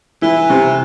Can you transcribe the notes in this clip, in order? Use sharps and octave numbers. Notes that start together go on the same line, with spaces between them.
E3 E4
C3